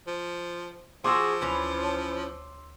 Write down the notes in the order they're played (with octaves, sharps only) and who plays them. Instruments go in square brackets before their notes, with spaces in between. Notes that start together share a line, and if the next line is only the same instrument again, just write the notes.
[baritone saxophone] F3
[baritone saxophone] F3 [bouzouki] F#4 G#4 [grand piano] C6 D6 E6
[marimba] D2 [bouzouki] E3 C#4 B4
[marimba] C#5 A5